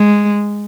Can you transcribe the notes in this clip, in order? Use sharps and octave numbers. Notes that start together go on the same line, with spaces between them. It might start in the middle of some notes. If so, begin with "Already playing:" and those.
Already playing: G#3